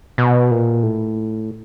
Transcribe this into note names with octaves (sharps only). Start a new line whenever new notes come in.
B2
A#2
A2